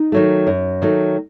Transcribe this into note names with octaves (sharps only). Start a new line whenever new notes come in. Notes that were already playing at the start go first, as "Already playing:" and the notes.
Already playing: D#4
D#3 F#3 A3
F#2
D#3 F#3 A3